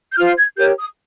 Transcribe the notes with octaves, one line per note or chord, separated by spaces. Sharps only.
G6
F4 C5 F6
G#6
G4 A#4 C#5 G6
D#6